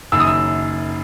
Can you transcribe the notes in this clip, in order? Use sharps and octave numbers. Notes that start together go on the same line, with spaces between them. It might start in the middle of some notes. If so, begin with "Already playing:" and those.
F#1 F#2 D#3 E6
D#6
E6